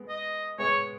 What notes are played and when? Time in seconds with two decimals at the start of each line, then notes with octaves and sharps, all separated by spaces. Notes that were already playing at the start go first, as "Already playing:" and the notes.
Already playing: G#3 B3
0.09 D#5
0.58 G#3 B3 C#5